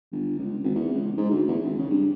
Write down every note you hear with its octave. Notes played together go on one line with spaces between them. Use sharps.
G1
C#2
G#1
E2
C#2
G#2
D2
E2
G#1
C#3
G2